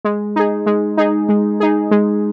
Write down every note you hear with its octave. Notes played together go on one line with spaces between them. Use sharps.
G#3
D#4 G#4
G#3
D#4 G#4
G#3
D#4 G#4
G#3